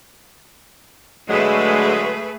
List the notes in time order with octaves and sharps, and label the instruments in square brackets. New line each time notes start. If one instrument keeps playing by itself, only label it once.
[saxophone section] D3 F#3 G#3 [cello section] A3 G#4 B4